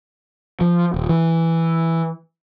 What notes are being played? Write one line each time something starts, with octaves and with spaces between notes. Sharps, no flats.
F3
D#1
E3